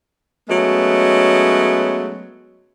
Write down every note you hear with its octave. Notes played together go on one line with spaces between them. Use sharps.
F#3 G#3 A3 B3 C#4